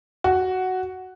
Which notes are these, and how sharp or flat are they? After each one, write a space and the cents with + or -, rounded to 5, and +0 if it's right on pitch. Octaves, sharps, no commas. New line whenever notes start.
F#4 +5